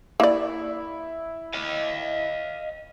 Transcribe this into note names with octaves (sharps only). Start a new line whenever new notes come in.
A#3 E4 D5
D#5 F5